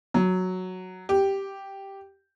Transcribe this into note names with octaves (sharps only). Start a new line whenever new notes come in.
F#3
G4